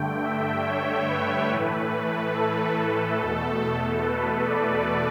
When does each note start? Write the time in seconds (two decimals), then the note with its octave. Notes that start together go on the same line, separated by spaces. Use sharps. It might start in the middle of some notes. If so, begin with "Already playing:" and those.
Already playing: G2 D3 A3 G5
0.23 E5
0.65 C#5
1.08 B4
1.49 A2 E3 A3 B4
2.34 A4
3.18 E2 B2 A3
4.03 B4
4.46 D5